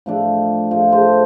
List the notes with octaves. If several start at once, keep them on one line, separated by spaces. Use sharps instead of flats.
A2 F3 A3 D4
A2 F3 A3
A4 C5